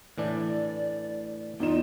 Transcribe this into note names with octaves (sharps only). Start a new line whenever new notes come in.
A2 E3 D4 D5
E2 D#4 F4 E7